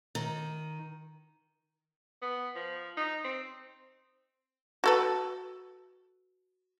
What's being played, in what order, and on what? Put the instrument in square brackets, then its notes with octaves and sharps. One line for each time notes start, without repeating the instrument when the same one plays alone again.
[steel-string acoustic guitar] D#3
[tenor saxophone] B3
F3
D#4
C4
[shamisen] F#4 A4 B4